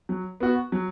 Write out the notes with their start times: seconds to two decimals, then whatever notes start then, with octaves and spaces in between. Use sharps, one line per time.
0.09 F#3
0.40 B3 F#4
0.72 F#3